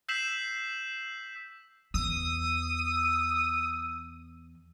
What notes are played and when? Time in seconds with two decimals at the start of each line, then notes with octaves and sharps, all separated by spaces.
0.09 E6 G6 B6 C7 E7 F#7
1.94 E2 D#6 E6